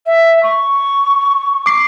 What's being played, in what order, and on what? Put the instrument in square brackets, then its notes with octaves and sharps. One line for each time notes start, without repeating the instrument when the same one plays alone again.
[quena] E5
C#6
[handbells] D6 C7